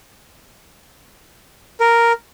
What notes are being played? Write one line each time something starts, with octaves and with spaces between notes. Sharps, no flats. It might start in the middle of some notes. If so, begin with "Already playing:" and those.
A#4